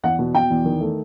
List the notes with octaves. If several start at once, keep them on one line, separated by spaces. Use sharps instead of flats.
E2 F#5
B2
B2 G5
E2
D#3
A3